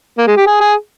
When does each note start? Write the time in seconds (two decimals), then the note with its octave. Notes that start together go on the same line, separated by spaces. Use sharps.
0.18 A#3
0.27 G#3
0.37 G4
0.47 G#4
0.61 G#4